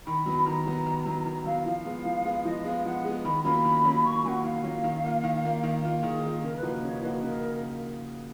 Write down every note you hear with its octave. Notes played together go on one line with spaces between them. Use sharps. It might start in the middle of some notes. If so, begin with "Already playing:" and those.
D#3 B5
F#3 B3
D#3 A#5
F#3 B3
D#3
F#3 B3
D#3 A#5
F#3 B3 F5
F3 F5
G#3 B3
F3
G#3 B3
F3 D#5
G#3 B3 F5
F3 F#5
G#3 B3
D#3 B5
F#3 A#3 C#4 F4 B5
D#3
F#3 A#3 C#4 F4
D#3 C#6
F#3 A#3 C#4 F4 F#5 G#5
D#3 F5
F#3 A#3 C#4 F4
D#3
A#3 F4
D#3
A#3 F4
D#3
A#3 F4
D#3 G#4
A#3 F4
C#3 A#4
B4
F3 A#3 D#4 F#4
C#3 C#5
F3 A#3 D#4 F#4 B4
C#3 A#4